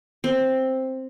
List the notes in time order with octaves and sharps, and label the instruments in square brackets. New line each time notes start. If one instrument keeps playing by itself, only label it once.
[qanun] C4